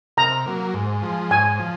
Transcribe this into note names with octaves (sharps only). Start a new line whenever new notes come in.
C3 A#5
F#3 A#3
G#2
F3 G#3
G#2 G#5
F3